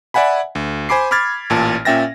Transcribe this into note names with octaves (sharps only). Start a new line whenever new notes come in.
D5 E5 F#5 G#5 B5
D2
C5 G#5 B5 D6 C7
B5 D6 F6 G#6 A6
A1 A#2 A5
A#2 C#4 E5 G5 A6 A#6